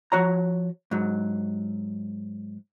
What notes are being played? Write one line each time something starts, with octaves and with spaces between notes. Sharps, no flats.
F3 F#4 C#5 A#5
G#2 F#3